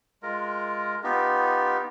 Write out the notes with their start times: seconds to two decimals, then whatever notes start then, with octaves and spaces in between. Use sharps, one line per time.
0.23 G#3 F4 A#4
1.04 B3 D#4 F4 G4